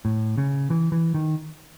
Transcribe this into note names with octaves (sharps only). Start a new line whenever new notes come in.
A2
C#3
E3
E3
D#3